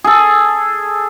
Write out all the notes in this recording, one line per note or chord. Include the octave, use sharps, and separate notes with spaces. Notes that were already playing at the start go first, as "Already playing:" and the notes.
G#4 A4